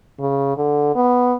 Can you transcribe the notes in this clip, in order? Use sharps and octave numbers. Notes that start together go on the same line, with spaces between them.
C#3
D3
B3